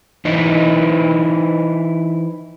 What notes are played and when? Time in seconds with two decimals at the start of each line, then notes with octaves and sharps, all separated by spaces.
0.25 E3 D#4 E4 B4 C5 D#5